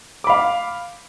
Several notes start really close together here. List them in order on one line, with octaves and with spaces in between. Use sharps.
D6 B5 F5